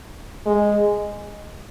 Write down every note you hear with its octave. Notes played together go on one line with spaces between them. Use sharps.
G#3